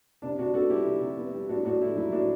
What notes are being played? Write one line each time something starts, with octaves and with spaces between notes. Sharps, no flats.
C3 D4
C3 D4 F#4
B3 F#4 A4
G3 E4 G4
C3
C3
B3
G3
A2 D4 F#4
A2 D4 F#4
A3 E4
F#3 E4
A2 D4 F#4